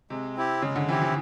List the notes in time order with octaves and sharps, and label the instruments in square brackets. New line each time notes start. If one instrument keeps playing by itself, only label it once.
[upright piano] C3 [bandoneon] G#3
[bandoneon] C4 E4 G4
[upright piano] C#3 [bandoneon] G#3
[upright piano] D3
[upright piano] E3 [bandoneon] C4 E4 G4
[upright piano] E3